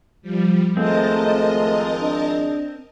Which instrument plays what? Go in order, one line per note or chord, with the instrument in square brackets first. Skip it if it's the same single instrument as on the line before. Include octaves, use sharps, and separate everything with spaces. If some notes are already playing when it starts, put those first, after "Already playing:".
[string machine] F3 G3
[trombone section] G#1 F3 G#3 [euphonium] A3 [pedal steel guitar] C4 [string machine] A#4 D#5 A5
[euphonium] D4